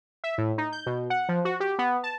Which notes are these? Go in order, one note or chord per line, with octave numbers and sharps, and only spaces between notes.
E5
A2
D#4
G6
B2
F#5
F3
F#4
G4
B3
A5